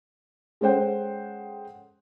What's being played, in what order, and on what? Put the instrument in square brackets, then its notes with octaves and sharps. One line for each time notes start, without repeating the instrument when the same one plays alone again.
[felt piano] G#3 C#4 A4 C5 F#5 G5